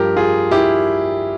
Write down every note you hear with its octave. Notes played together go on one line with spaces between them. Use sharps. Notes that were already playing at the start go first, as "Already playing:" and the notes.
Already playing: G2 F3 G4 A#4
F4 G#4
E4 G4